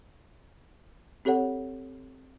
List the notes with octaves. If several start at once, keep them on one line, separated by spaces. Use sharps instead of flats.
C4 G4 A4 C#5 F#5